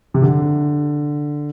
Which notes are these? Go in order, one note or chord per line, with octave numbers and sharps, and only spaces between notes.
C3
D3